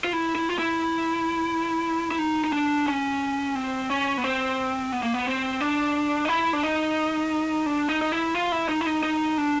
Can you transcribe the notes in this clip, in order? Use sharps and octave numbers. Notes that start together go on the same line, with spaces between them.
F4
E4
E4
F4
E4
E4
D#4
D#4
D4
C#4
C4
C#4
B3
C4
B3
A#3
B3
C4
D4
D#4
E4
D4
D#4
D4
D#4
D#4
E4
F4
E4
D#4
E4
D#4
D#4
D4